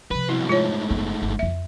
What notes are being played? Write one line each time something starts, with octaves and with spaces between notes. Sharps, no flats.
C3 F3 B4
C2 B2 E4
G#2 A3 F4 C#5
F#1 B3
G1 F#2
F2 F3 E5